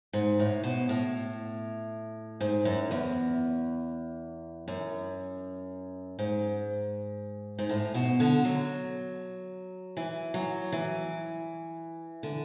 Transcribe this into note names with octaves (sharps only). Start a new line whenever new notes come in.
G#2
A2
B2
A2
G#2
F#2
E2
F#2
G#2
G#2
A2
B2
D3
F#3
E3
F#3
E3
D3